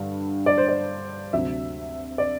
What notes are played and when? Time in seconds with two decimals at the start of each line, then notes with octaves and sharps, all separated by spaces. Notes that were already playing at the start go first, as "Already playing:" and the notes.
Already playing: G2 D3 G3
0.46 D5
0.58 C5
0.68 D5
1.33 D2 C3 F#3 E5
2.18 D5